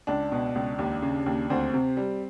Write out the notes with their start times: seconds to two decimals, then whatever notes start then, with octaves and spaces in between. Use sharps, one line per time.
0.07 C#2 D4
0.32 B2
0.55 C#2
0.79 D#2
1.02 C#3
1.26 D#2
1.50 D2 C4
1.74 C3
1.97 G3